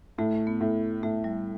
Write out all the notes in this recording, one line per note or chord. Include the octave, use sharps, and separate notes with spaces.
A2 A3
B3
A2
A2 A3
G3